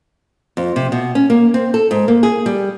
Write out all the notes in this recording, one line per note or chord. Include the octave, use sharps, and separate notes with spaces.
F2
C3
B2
C#4
A#3
C4
A4
G#2
A#3
G#4
G3